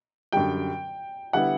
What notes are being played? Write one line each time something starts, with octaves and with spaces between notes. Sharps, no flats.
F#2 D3 G3 G5
D3 G3 B3 E4 F#5